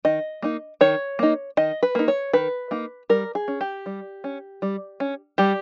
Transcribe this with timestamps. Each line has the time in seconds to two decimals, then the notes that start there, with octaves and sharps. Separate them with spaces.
0.05 D#3 D#5
0.42 A#3 D#4
0.81 D#3 C#5
1.19 A#3 D#4
1.57 D#3 D#5
1.83 B4
1.95 A#3 D#4
2.08 C#5
2.33 D#3 B4
2.71 A#3 D#4
3.09 G3 A#4
3.35 G#4
3.48 C#4
3.61 G4
3.86 G3
4.24 C#4
4.62 G3
5.00 C#4
5.38 G3 G4